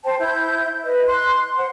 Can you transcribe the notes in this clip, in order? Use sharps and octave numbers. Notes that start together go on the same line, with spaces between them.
C5 G5 A5
E4 G6
B4 D#5
C6 F#6
C5 F#5